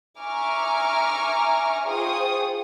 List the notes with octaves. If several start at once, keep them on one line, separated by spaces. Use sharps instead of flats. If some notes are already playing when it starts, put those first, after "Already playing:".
E5 G#5 A#5 C#6 D6 F6
F4 G#4 C5 G5 C#6 D#6